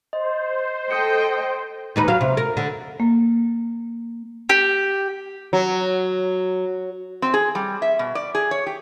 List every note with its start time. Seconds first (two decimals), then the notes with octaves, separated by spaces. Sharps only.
0.13 C5 D#5
0.91 A4 D#5 G5 D#6 G6 C#7
1.96 D#2 D#4 B4
2.08 F#3 F5
2.21 C3
2.37 A#4
2.57 D3
3.00 A#3
4.49 G4
5.53 F#3
7.22 C4
7.34 G#4
7.55 G3
7.82 E5
7.99 B2
8.15 D5
8.35 G#4
8.51 C#5
8.66 G4